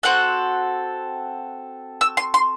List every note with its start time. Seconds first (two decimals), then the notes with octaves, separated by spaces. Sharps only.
0.03 C4 F#4 A4 F#6
2.01 E6
2.17 C6
2.34 C6